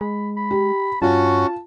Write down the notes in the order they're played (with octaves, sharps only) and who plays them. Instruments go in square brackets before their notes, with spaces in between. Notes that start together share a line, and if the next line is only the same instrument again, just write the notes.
[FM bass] G#3 [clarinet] B5
[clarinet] B5
[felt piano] G4
[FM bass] G2 [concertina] C#4 F#4 [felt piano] F4 [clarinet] A5